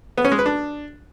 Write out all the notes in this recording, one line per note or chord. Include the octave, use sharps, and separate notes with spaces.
B3
C#4
G#3
B4
D4